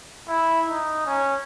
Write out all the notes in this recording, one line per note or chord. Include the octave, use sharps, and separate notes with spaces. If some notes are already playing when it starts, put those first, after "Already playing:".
E4
D#4
C#4